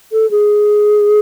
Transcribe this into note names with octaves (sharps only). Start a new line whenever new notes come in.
A4
G#4